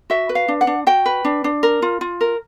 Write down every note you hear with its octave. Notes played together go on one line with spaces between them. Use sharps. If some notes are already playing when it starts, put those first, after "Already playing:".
F#4 E5
B4
F5
D4
F#5
D4
F#4 G5
B4
D4
D4
A#4
F4
F4
A#4